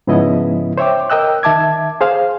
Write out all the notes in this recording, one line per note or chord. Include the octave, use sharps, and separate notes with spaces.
G#2 C#3 F3 B3 E4 D#5
C5 C#5 E5 G5 D6
A#4 D#5 G5 E6 F#6
D#3 E5 A5 D6 G#6
G#4 C5 F5